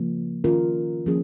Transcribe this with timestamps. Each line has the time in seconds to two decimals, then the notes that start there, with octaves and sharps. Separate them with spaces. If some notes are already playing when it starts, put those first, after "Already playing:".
Already playing: C#3 F3 A#3
0.44 D#3 C#4 F4 A#4
1.06 F3 A#3 C#4 G#4